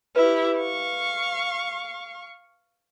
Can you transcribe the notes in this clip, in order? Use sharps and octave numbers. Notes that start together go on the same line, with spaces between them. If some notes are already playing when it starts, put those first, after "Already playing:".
E4 G4 B4
F5 C#6